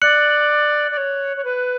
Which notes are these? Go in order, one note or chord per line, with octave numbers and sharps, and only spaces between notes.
D5 F#6 C#7 F#7
D5
C#5
C#5
B4